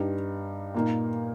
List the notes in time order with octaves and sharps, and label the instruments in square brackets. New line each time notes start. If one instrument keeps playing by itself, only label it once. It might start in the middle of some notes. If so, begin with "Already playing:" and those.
Already playing: [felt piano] G2 G3 D#4
A#2 A#3 D#4